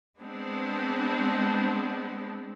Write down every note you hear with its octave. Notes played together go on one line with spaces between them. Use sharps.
G#3 B3 C4 D4